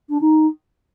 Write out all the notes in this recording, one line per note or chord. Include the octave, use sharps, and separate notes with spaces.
D4
D#4